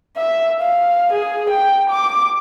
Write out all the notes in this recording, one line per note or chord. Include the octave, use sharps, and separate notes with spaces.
E5
F5
G#4
G5
D6